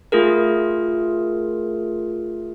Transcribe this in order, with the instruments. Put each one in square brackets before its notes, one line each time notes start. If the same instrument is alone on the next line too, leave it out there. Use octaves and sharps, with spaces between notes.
[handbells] A3 F4 G#4 A#4